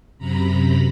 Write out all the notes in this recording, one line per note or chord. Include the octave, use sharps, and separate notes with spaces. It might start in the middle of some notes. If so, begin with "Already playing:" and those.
F#2 C3 A#5 B5